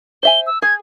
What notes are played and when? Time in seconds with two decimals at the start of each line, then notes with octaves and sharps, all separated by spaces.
0.23 C5 E5 G#5 G7
0.47 E6
0.62 G#4 G#6